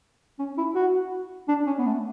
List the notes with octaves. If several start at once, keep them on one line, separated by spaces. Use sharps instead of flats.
C#4
E4
F#4
D4
C#4
B3
A3